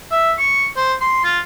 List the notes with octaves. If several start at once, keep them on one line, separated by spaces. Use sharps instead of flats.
E5
C#6
C5
C6
F4